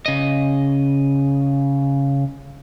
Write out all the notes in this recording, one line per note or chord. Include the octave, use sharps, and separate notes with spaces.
C#3 D#5